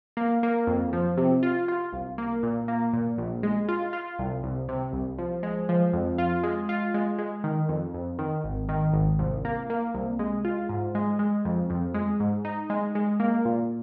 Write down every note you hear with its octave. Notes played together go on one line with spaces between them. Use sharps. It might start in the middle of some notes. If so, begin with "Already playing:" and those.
A#3
A#3
F2
F3
C3
F4
F4
C2
A#3
A#2
A#3
A#2
A#1
G#3
F4
F4
C2
C2
C3
C2
F3
G#3
F3
F2
F4
G#3
F4
G#3
G#3
D#3
F2
F2
D#3
G#1
D#3
G#1
C2
A#3
A#3
C2
G#3
F4
G#2
G#3
G#3
F2
F2
G#3
G#2
D#4
G#3
G#3
A#3
A#2